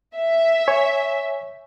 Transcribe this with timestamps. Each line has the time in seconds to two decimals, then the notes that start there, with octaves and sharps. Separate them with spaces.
0.16 E5
0.68 C#5 G#5